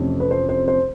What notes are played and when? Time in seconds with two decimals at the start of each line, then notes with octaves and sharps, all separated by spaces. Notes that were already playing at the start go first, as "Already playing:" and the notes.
Already playing: F2 C3 E3 A3 C#4
0.20 B4
0.31 C5
0.49 C5
0.68 C5